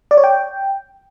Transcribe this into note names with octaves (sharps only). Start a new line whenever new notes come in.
D5
C#5
G5